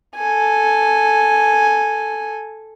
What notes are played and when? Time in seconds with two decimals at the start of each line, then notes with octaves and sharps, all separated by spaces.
0.17 A4 G#5